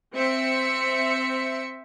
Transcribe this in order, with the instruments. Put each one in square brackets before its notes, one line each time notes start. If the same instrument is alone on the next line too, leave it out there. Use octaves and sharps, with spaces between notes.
[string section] C4 E5 C#7